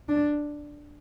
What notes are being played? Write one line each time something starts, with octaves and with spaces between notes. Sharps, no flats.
D4